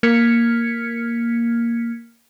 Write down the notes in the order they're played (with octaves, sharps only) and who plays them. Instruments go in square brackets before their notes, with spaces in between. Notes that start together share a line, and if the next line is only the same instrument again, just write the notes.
[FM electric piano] A#3 F6 G#6 B6 C#7